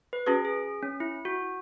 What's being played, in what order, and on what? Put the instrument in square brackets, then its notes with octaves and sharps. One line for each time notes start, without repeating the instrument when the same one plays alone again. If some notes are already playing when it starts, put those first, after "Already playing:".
[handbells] B4
[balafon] C#4 F#4 B4 [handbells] G#4
[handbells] G#4
C#4
E4
F#4